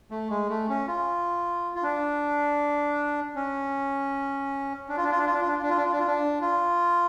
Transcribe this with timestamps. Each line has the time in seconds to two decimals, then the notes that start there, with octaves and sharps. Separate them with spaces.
0.11 A3
0.30 G#3
0.50 A3
0.69 C#4
0.87 F4
1.75 F4
1.83 D4
3.36 C#4
4.89 D4
4.97 F4
5.03 D4
5.11 F4
5.18 D4
5.26 F4
5.34 D4
5.41 F4
5.48 D4
5.54 F4
5.62 D4
5.70 F4
5.77 D4
5.85 F4
5.92 D4
6.00 F4
6.07 D4
6.41 F4